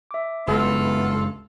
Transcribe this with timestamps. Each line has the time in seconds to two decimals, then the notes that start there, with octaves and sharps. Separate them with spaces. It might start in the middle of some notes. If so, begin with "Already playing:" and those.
0.11 E5 D6
0.47 F#1 C#2 G2 B3 F4 A4